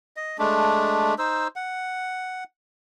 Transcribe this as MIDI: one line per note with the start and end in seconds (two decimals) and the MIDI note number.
0.16 0.37 75
0.39 1.14 56
0.39 1.14 57
0.39 1.14 62
1.19 1.48 63
1.19 1.48 72
1.19 1.48 88
1.56 2.44 78